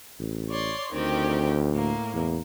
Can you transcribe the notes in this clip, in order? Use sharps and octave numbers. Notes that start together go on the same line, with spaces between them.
A1
C#5 D5 C6
D2 D#3 C4 G4
A2 A#3
E2